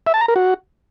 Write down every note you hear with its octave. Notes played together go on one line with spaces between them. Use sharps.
E5
A5
A#5
A#4
F#4